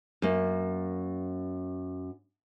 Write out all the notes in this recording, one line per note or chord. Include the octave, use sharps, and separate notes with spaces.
F#2 A#3